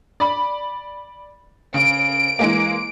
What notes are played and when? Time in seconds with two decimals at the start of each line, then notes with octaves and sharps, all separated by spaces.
0.20 D5 B5
1.74 C#3 D7
2.39 E3 G#3 A#3